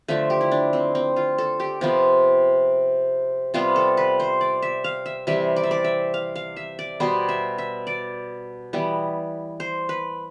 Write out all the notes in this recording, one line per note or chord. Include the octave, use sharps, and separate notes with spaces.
D3 F3 A3 E5
G4
E4
D4
C4
C4
F4
A4
G4
C3 F3 B3
C3 G3 B3 F4
A4
B4
C5
D5
E5
F5
E5
C3 E3 G3 E5
D5
E5
D5
E5
F5
F5
E5
D5
B2 G3 B3 C5
E5
E5
D5
E3 G3 B3
C5
B4